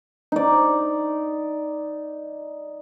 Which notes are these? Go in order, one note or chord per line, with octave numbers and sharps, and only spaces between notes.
D#4 D5